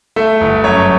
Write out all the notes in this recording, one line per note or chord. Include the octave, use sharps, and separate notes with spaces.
A3 E5
G1
F#2 C#5